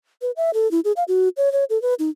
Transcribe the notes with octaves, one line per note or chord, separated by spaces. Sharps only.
B4
E5
A4
E4
G#4
F5
F#4
C#5
C#5
A4
B4
D#4